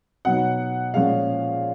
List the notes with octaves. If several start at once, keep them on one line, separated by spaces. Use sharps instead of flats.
B2 F#3 B3 D#4 F#5
A#2 F3 G#3 C#4 F5